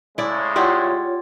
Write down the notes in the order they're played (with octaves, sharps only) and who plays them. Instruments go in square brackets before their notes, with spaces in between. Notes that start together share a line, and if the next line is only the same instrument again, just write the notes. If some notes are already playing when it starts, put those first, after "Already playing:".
[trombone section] A2 C#3 G#3 [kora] E4 D5
[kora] E4 G4 D5 [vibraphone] F4 C#5 [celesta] F#5 C6